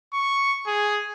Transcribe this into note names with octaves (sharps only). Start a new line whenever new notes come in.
C#6
G#4